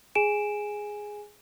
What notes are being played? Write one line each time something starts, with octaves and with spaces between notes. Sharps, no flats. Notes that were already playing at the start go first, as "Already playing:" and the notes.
G#4 G#5 D7 E7